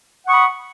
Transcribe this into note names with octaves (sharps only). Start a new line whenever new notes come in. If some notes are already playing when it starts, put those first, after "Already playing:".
F#5 B5 C#6 D#6